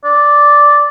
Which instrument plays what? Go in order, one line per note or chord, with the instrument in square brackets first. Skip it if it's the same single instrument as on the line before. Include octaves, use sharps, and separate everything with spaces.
[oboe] D5